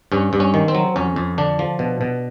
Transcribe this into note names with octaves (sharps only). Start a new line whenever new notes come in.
G2 C#4
G2
C#4
D#3
C4
F#3
F2 C#4
F2
D3 D4
F3
B2
B2